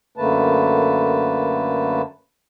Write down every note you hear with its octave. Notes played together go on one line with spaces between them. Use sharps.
F#2 D3 A3 A#3 B4 A5